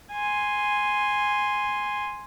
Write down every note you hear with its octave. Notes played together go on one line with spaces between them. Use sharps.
G#5 C6